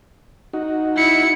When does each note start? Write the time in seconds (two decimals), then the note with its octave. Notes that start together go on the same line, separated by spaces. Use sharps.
0.53 D#4 F#4
0.96 E4 C#7